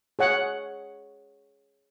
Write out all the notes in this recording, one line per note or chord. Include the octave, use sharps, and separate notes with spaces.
G#4 C#5 F#5